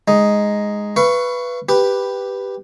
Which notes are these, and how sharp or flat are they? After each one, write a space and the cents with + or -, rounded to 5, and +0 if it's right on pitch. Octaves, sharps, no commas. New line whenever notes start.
G#3 +0 D#4 +0
B4 +0 F5 -45 C#6 +0
G4 +0 B4 +0